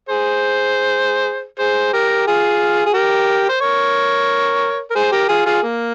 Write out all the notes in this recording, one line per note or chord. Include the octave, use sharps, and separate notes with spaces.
G#4 C5
G#4 C5
G4 A#4
F4 G#4
G#4
G4 A#4
C5
A#4 C#5
A#4
G#4 C5
G4 A#4
F4 G#4
F4 G#4
A#3